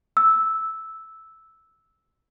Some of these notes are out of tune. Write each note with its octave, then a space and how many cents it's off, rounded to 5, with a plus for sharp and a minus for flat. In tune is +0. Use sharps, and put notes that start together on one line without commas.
E6 -5